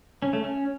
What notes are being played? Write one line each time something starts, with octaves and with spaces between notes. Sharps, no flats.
C#4
A3
C#4